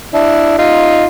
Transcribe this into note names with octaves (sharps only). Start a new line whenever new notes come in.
D4 E4
D#4 F4